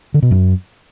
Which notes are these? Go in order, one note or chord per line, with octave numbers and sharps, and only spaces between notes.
D3
B2
F#2